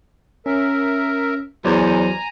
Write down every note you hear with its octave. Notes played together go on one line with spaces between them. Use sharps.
C#4 A#4 E5
E2 F#3 C5 D5 G#5 A#5